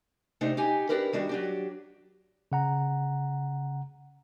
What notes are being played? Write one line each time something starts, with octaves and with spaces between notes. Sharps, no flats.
C3 A3 D4 D#4 C5
D#4 G4 G#5
D4 E4 G4 A#4 B4
D#3 G3 D4 F#4
F#3 D4 G4
C#3 F#5 A#5